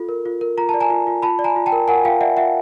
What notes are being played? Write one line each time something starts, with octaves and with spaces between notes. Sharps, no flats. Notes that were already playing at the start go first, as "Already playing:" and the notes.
Already playing: F4 A4
A#4
F4
A#4
F4 A#5
A5
D5
G#5 A#5
F4
F4
F4 A5 B5
D5
G#5 A#5
F4
G5 A5
A#4
A#4 F#5 G#5
F4 F5 G5
D5 E5 F#5
F4 E5 F#5